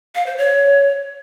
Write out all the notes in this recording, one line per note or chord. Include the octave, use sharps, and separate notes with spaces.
F5
C5
C#5